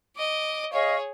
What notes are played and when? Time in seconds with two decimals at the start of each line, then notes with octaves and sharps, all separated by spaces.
0.16 D#5 D6
0.73 G#4 C#5 D#5 F5 C#6